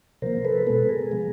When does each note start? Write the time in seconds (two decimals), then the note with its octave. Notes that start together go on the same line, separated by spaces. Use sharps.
0.22 C3 F3 A#3 A#4 C5
0.45 A4 B4
0.67 B2 G#3 B3 A4 B4
0.89 G#4 A#4
1.11 C3 F3 G#3 B3